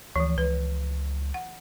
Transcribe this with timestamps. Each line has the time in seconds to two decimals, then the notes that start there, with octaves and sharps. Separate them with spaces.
0.16 D2 E3 F3
0.38 C#2 B4
1.34 F#5